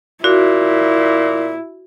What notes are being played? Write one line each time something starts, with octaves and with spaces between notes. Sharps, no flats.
A#2 E4 F#4